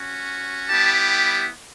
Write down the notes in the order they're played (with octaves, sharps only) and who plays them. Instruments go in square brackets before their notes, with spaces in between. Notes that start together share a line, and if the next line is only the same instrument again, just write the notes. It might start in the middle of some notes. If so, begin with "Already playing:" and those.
Already playing: [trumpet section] C#4 F#4
G3 B3 E4 G4 A5